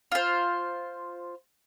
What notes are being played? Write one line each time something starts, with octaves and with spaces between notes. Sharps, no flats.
F4 C5